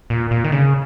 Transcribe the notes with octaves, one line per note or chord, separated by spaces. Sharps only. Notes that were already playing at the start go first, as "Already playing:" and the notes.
A#2
A#2
D#3
C#3